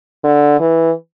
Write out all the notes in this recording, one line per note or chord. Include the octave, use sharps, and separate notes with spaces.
D3
E3